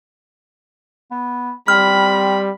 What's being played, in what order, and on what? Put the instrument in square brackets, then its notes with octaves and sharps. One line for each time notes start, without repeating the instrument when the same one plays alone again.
[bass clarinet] B3
[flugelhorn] G3 [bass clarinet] C4 [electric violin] B5 [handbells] F6